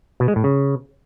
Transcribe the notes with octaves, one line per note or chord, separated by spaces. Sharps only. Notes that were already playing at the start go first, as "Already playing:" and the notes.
B2
G#3
A2
C#3